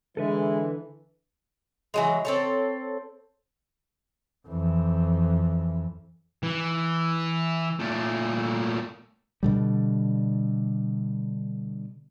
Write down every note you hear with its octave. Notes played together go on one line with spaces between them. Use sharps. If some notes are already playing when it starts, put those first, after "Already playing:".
D3 E3 G#3 A4 B4 E5
E3 F#3 G#3
C4 A4 C#5
F2 E3
E3
A#2 A3
B2 D3 G3